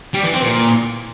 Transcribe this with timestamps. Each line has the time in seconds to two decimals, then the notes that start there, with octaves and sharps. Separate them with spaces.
0.14 G3
0.23 E3
0.33 C4
0.43 A#2